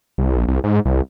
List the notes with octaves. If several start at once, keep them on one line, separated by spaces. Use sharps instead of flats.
C2
A#1
C2
G#2
C2